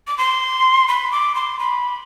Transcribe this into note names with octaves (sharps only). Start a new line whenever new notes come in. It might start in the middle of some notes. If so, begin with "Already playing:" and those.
D6
C6
B5
D6
C6
B5